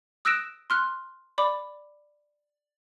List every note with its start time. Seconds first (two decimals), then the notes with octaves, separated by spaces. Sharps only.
0.25 D#6 E6 F#6 A#6 D7 E7
0.70 C6 F6 F#6
1.38 D5 B5 D6